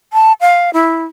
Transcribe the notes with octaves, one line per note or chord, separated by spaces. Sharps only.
A5
F5
E4